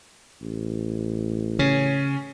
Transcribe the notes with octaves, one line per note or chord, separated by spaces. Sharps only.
A1
C#3 C#4